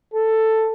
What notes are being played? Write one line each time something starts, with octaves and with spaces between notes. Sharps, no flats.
A4